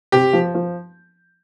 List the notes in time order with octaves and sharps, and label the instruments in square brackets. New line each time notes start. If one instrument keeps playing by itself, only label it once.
[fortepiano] C3 [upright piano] G4
[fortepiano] F3
F3